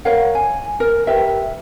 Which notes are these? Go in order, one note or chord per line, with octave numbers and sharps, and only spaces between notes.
A#4 C#5 F5 F#5
G#5
A#4
G4 A#4 B4 E5